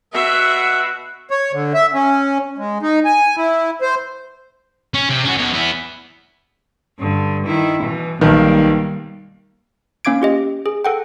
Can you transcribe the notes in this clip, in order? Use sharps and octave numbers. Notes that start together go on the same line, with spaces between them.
B2 F#4 E5
C#5
D3
E5
C#4
G#3
D#4
G#5
E4
C5
C#4
C3
C#4 F#4
B2 C#5
B3 E4
G2 D3
D#3 E4
B2 E3
B1 D#3 G3 A#3
A#3 C#4 F5 D6 G#6 D7
F4 G4 D#5
G#4
A4 F#5 G5